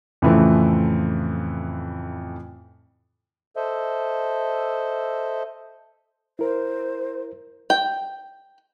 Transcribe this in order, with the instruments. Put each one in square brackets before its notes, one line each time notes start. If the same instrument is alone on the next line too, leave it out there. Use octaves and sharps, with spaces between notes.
[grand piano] F2 A2 C#3 E3 A3 C4
[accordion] A4 C5 D#5 E5
[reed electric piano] E4 A#4 [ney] C5
[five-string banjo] G5